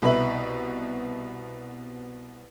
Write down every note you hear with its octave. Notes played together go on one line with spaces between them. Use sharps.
C2 B2 B4 E5 F#7